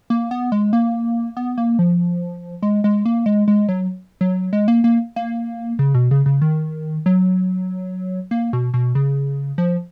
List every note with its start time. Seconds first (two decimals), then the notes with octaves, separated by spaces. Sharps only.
0.10 A#3
0.31 B3
0.52 G#3
0.73 A#3
1.37 B3
1.58 A#3
1.79 F3
2.62 G#3
2.84 G#3
3.05 A#3
3.26 G#3
3.48 G#3
3.69 F#3
4.21 F#3
4.53 G#3
4.68 A#3
4.84 A#3
5.16 A#3
5.79 C#3
5.94 B2
6.11 C#3
6.26 C#3
6.42 D#3
7.06 F#3
8.31 A#3
8.53 B2
8.74 B2
8.95 C#3
9.58 F3